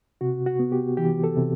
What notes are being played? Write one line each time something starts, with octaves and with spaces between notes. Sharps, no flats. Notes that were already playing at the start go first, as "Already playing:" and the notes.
C3 F#4
F#4
B3
G4
E3 G4
A4
C3